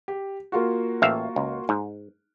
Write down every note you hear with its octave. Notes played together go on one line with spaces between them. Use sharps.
G4
A#3 F4 F#4
A1 E5 F5
C#2
G#2